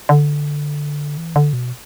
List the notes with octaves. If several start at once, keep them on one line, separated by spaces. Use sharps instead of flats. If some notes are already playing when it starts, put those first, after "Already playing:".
D3
E3
D3
B2